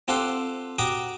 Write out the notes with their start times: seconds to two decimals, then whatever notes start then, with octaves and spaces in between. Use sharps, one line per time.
0.08 C4 F4 G4 A4 F5 F#5
0.78 F#4 G4 G5 A#5 D6 D#6